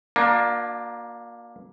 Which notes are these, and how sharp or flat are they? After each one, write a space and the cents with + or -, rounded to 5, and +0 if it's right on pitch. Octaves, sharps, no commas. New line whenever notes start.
A#3 +15 D4 +25 F#4 -40